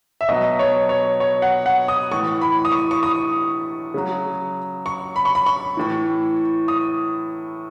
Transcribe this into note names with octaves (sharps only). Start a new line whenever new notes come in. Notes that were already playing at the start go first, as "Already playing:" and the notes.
E5
B2 F#3 D#5
C#5
C#5
C#5
F#5
F#5
D#6
A2 E3 C#6
B5
D#6
C#6
C#6
D#6
C#3 F#3
C#6
B5
C#6
B5
C#6
A2 E3
D#6